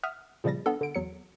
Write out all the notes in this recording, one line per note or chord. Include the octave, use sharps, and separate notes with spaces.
E5 F#5 D#6 F6
A#2 C#3 F3 G3 A6 A#6
B3 D4 A4
D3 D7
E2 F#3 C#7